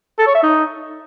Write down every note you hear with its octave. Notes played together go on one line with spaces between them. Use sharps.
A4
C#5
E5
D#4